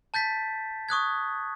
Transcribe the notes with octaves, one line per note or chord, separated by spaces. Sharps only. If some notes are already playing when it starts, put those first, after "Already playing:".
A5 G6 A6 B6
C#6 D#6 F#6 G#6